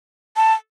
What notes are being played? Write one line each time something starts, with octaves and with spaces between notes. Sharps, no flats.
A5